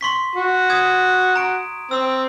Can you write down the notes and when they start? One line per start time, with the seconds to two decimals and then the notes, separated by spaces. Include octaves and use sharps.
0.01 C6 C#6 B6
0.36 F#4
0.70 D#6 G#6
1.35 A#5 D7
1.91 C4 E6